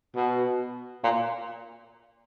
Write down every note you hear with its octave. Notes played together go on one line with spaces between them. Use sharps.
B2
A#2